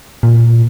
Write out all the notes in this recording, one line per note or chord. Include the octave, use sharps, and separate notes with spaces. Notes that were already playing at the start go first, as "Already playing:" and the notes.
A#2